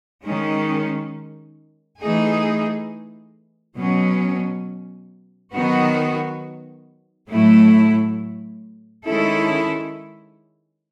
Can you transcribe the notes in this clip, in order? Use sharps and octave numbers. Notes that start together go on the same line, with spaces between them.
D#3 G#3 C#4
E3 A3 D#4 G#4
B2 F#3 C#4
D#3 F#3 B3 F#4
A2 F#3 A3 E4
D#3 G#3 C#4 E4 A4